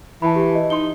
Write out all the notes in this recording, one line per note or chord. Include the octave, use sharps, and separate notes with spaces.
E3 A5 B5
G4
D#5
D#4 C6 G7